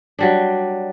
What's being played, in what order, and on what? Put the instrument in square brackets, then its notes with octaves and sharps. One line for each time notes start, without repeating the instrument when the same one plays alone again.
[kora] F#3 G3 D4